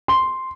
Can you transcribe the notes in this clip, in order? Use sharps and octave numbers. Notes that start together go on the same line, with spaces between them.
C6